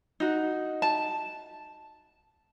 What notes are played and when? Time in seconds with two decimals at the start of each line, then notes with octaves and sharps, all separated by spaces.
0.20 D#4 F#4
0.82 A5